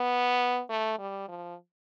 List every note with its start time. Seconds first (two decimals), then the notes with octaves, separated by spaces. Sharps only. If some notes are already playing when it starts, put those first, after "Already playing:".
Already playing: B3
0.70 A3
0.99 G3
1.29 F3